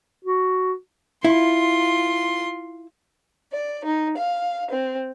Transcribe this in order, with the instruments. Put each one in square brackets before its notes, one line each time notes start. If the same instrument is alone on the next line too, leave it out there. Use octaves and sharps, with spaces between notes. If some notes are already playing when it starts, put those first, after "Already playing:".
[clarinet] F#4
[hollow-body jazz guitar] E4 [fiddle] F4 C6
[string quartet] D5
D#4
F5
C4